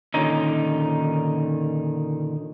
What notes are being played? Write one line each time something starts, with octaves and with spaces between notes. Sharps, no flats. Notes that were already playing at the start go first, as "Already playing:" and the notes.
A#2 D3 D#3 C#4 D#4